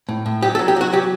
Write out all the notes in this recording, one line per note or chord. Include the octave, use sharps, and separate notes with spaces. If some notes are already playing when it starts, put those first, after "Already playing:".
A2
A2
F#3 G4
A4
F#3
G4
F#3 F#4
F#3 G4